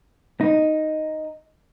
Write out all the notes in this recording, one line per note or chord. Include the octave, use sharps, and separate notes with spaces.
D#4